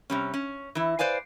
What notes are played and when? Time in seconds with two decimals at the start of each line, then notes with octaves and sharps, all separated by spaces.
0.10 C3 G3 C#4
0.34 C#4
0.75 E3 E4
0.99 B4 C5 D5 F5 G#5